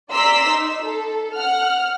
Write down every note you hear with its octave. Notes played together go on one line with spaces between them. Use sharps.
D5 A#5 C6 E6 B6
D#4
A4
F#5 F6